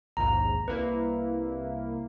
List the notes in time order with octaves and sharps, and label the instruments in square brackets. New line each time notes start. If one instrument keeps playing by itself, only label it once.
[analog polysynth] A#1 D#2 G#2 [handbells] A#5
[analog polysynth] C2 A#3 E4 [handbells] B4